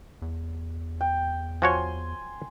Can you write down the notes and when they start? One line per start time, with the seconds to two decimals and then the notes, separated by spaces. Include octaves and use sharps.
0.22 E2
1.01 G5
1.62 F3 F#4 C#5 G#5 C6